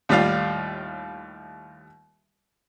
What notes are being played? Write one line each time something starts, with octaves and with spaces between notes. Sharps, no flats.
D#2 A2 G3 F4 F5